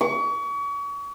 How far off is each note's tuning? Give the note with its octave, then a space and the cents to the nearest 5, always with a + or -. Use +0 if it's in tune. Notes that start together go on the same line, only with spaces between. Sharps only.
C#6 +35